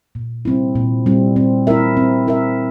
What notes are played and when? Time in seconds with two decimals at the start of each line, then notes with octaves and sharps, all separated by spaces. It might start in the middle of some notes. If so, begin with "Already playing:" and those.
0.15 A#2
0.45 G3 C4 E4
0.76 A#2
1.06 G3 C4 E4
1.36 C4
1.67 E4 A#4 E5
1.97 C4
2.27 E4 A#4 E5